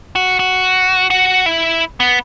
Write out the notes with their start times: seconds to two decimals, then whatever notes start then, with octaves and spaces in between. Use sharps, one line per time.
0.16 F#4
0.39 F#4
1.10 F#4
1.46 E4
2.00 B3